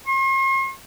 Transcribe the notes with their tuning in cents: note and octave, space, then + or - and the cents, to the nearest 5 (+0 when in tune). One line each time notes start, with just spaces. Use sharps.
C6 +45